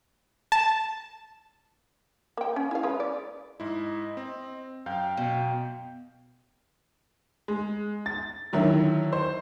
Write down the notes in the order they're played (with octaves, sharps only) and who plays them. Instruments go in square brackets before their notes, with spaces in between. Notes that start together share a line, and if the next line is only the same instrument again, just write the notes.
[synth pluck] A5
[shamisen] A#3 G5
C#4
E4 G#4 F5
G#3 C#4 B4
D5
[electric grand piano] G#2 E4 [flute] D#5
[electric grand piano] C4
[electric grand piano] F#2 F5 G6 [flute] G5
[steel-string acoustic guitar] B2
[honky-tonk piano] G#3
A6
D3 D#3 F#3 E4
C5